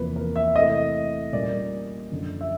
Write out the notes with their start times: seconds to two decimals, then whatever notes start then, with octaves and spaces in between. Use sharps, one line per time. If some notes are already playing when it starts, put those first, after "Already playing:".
Already playing: E2 C3 F3 A#3 B4
0.16 A#4
0.36 E5
0.55 C3 E3 A3 D#5
1.33 A#2 G3 A#3 C#4 D5
2.11 F#2 D3 F3
2.41 E5